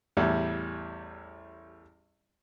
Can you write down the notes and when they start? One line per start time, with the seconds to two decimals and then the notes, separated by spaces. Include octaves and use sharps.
0.17 A1 E2 G3